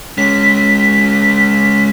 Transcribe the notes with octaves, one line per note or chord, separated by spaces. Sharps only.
G#3 C#4 B6